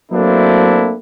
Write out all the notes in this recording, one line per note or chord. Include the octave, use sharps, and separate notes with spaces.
F#3 A3 A#3 C4 D4 E4